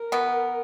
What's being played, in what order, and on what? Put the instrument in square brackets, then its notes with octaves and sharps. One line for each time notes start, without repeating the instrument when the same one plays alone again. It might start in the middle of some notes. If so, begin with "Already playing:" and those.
Already playing: [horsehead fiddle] A#4
[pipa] B2 B3